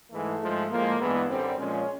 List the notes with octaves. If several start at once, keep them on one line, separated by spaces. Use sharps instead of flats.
G#2 E3 G#3 A3
G#2 F3 G#3
A2 F3 G#3 A#3
G2 E3 G#3 B3
F#2 D3 G3 C4
A#2 F3 G#3 C#4